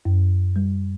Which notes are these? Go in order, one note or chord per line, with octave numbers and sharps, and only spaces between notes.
F#2
G3